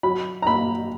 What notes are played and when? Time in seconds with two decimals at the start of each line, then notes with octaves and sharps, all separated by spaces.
0.03 F#3 B5
0.42 A#5
0.47 A#3 B5